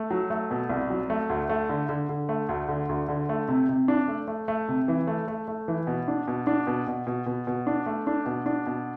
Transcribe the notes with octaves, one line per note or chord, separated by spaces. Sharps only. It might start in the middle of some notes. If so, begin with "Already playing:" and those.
Already playing: A3
F#3
A3
B2
C2
F#3
A3
D2
A3
D3
D3
D3
A3
D2
D3
D2
D3
A3
C3
C3
D4
A3
A3
A3
C3
E3
A3
A3
A3
E3
B2
D4
B2
D4
B2
B2
B2
B2
B2
D4
A3
D4
B2
D4
B2